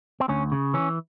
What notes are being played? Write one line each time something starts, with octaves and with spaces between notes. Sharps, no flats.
C4
D2 C#4
C#3
E3 C#4